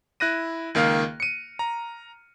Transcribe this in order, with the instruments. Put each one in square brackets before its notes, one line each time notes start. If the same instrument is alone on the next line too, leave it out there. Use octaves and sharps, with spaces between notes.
[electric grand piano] E4 F#6 A#6 D#7
C#2 D#3 A#3 F5 F6
C#7 D#7
A#5